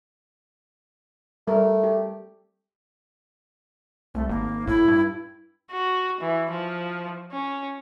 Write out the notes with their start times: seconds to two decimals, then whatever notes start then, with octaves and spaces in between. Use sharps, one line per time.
1.47 G3 A3 A#4
1.84 G4
4.15 C2 A3
4.29 G#1 A#3
4.67 A2 E4
4.88 G2
5.71 F#4
6.21 E3
6.51 F3
7.32 C#4